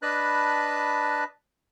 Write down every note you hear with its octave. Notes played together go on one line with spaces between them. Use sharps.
D4 B4 D#5 A5 B5 F#6